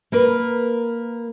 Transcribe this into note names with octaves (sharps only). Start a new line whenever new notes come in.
A#3 A#4 B4